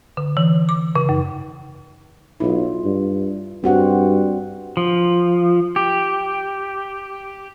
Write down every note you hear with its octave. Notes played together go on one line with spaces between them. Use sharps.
D3
E3
D6
C#3
F#2
B1 E4 F4
G2
G2 C4 F#4 F#5
F3
G4